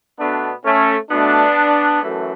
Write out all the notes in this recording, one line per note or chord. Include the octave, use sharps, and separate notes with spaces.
B2 A3 B3 D4
A3 C#4
B2 A3 B3 D4
F#2 E3 A3